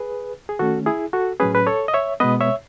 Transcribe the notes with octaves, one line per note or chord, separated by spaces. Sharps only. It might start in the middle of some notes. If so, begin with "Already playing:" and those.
Already playing: G#4 B4
G#4
D#3 A3 C#4 F#4 A4
E4 G#4
F#4 A4
A2 F#3 C#4 G#4 B4
B4
A4 C#5
D#5
C#5 E5
B2 G#3 B3 B4 D#5
C#5 E5